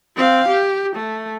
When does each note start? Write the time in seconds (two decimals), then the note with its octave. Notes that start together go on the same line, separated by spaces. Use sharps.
0.16 C4 F5
0.48 G4
0.95 A3